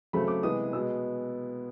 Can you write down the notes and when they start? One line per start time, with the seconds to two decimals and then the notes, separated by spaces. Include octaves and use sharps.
0.13 C#3 F#3 A3 C4 B5
0.28 D6
0.43 C3 E3 G#3 B3 D#6
0.73 B2 G#3 B3 E6